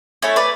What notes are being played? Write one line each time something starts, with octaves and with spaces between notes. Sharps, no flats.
A3 C#4 E4 A4 C#5
B4 D5